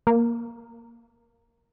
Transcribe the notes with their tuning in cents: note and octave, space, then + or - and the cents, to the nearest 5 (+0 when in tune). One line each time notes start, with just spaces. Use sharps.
A#3 +10